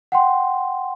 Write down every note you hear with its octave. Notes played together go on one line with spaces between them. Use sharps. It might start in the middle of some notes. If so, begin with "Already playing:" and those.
F#5 G5 C6